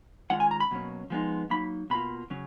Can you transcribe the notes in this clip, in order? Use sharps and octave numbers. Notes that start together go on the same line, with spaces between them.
D#3 G#3 C#4 F4 F#5
G#5
A#5
B5
B2 F#3 A#3 C#4
F3 G#3 B3 D#4
F#3 A#3 D#4 B5
B2 A#3 F4 B5
C#3 F#3 C#4